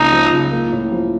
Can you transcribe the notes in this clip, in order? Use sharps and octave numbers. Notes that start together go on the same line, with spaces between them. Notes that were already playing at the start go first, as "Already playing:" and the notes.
Already playing: C#2 C#3 F3 A#3 D#4
F3
C#2
A#3
A2
F3